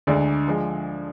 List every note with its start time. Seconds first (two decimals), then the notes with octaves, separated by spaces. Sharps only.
0.07 D2 D3 G#3 D5
0.48 F3 G#3